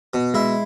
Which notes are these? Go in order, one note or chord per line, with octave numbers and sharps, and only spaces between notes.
B2
G#3 E4